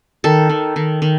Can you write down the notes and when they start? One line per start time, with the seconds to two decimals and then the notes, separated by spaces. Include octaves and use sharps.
0.24 D#3 A4
0.49 D#3
0.76 D#3
1.02 D#3